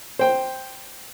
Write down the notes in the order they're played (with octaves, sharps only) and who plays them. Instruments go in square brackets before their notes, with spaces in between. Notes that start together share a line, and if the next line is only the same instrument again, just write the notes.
[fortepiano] C5 G5